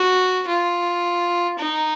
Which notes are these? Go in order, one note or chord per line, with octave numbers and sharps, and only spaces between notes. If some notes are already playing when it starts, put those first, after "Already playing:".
Already playing: F#4
F4
D#4